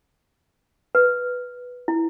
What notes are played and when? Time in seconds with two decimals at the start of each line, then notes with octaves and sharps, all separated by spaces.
0.95 B4
1.88 E4